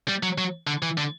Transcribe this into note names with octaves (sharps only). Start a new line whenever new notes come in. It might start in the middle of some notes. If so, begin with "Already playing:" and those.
G3
F#3
F#3
D3
E3
D3